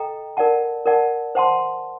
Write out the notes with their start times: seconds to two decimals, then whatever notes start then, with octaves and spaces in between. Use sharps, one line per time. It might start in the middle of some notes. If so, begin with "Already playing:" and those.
Already playing: A4 D#5 G5 A#5
0.37 A#4 D5 F#5 A5
0.86 A#4 D5 F#5 A5
1.35 C5 F#5 A5 C6